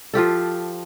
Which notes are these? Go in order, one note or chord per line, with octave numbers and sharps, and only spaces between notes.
F3 F4 G4 A4